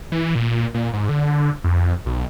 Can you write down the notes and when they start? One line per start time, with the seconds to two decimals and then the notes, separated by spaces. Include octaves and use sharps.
0.12 E3
0.35 A#2
0.74 A#2
0.94 G#2
1.09 D3
1.64 F2
2.06 B1